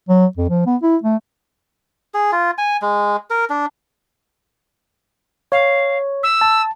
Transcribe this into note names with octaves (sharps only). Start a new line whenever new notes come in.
F#3
F2
F3
B3
E4
A3
G#4
F4
G#5
G#3
A#4
D4
C#5 F5
E6
A5